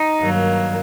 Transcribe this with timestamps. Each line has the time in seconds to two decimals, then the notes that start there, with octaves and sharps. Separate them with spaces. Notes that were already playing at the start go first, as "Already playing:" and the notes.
Already playing: D#4
0.22 G2 D#3 F#3 A#3